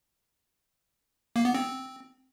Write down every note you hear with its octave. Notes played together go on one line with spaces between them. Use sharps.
A#3
B3
C4